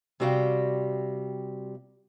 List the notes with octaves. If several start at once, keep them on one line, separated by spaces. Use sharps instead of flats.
C3 G3 F#4 F5 G5